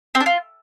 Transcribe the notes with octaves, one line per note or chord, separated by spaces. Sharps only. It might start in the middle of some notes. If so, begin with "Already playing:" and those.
C4
D4
F4